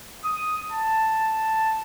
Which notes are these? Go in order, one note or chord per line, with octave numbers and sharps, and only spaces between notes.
D#6
A5